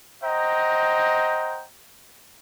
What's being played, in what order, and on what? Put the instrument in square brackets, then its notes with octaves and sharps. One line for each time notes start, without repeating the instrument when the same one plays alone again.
[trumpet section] C5 D#5 F#5 G5 A#5